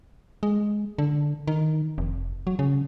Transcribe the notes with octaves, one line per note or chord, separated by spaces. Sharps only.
G#3
D3
D#3
F1
F#3
C#3